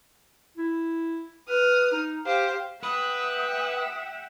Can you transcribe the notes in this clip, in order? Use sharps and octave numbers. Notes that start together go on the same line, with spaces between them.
E4
B4 D#6 F6
D#4
G4 C5 F5
B4 E5 F#5 G5 D#6